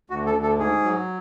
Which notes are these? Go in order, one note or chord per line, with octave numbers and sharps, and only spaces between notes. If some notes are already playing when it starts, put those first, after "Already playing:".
D2 F#4
A4
D2
A4
G#2 G#4
F#3